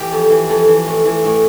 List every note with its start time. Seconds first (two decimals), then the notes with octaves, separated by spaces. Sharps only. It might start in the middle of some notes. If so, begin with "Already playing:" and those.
Already playing: E3 G4
0.11 F2
0.30 E3
0.49 F2
0.68 E3
0.87 A2
1.05 E3
1.24 A2